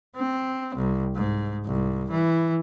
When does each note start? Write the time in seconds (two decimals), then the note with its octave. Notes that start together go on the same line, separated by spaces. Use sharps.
0.17 C4
0.76 C2
1.15 G#2
1.66 C2
2.11 E3